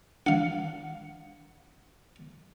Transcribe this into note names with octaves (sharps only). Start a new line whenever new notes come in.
D4 F5 F#5